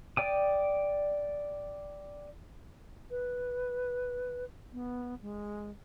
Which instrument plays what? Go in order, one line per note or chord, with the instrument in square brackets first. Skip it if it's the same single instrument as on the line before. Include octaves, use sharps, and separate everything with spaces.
[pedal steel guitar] D5 G5 D#6
[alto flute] B4
B3
G#3